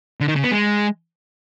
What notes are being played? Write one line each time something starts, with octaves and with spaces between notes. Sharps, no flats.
D3
D#3
C#3
B3
G#3